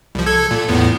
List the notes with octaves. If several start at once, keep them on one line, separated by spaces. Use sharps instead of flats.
C2 F3
A4 G#6
A#2
E2 A2 B3